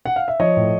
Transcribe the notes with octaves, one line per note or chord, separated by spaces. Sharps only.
F#5
F5
E5
F3 C#5 D#5
A2